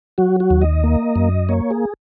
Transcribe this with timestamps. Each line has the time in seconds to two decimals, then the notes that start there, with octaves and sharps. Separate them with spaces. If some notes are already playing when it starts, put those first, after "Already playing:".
0.18 F#3 F#4
0.40 F#4
0.50 D#2
0.62 D#5
0.84 A#3
1.16 F#2
1.49 A#3 C#5
1.71 G#4